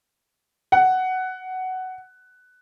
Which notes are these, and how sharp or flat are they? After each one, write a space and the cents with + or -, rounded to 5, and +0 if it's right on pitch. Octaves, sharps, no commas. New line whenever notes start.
F#5 +10